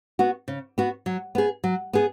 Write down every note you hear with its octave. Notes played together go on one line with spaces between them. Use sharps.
B3 F#4
C#3
B3 F#4
F#3
B3 G#4
F#3
B3 G#4